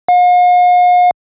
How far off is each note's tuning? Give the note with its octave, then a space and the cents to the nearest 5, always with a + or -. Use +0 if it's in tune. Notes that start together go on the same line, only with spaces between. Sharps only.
F5 +45